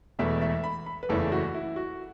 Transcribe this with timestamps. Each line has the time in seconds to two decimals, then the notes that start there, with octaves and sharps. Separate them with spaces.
0.19 E1 E2 B2 A3 E5
0.41 E5
0.64 B5
0.86 B5
1.03 B4
1.09 F#1 E2 C#3 E3 A3 A4
1.32 F#4
1.55 E4
1.76 F#4